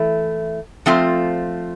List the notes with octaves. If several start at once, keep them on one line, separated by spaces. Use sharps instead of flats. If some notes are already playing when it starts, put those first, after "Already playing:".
Already playing: E3 A3
F3 A3 C4 F4